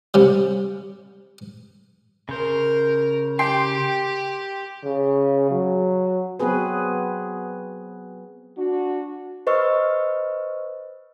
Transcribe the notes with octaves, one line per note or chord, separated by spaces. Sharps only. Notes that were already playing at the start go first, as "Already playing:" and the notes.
C3 G3
C#3 A#4 C5
G4 G5 C6 C7
C#3
F#3
F#3 B3 C4 F#4 G#4 B4
D4 F#4
B4 C5 D#5 C#6 E6 F6